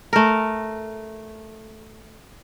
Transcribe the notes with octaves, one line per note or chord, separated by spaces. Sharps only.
A3 A#4